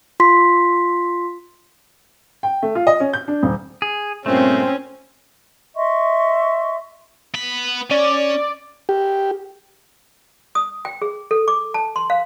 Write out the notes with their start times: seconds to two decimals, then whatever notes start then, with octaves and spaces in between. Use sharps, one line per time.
0.20 F4 C6 B6
2.43 G5
2.63 A3
2.75 F4
2.87 D#5
3.00 C#4
3.13 G6
3.28 D4
3.43 D#1
3.82 G#4
4.26 G2 A#2 A3 C4 C#4 C5
5.75 D#5 E5 C6 C#6
7.34 B3 B5
7.91 C#4 D5
8.89 G4
10.55 D#6
10.85 G5
11.02 G#4
11.31 A4
11.48 D6
11.74 A5
11.96 C6
12.10 F5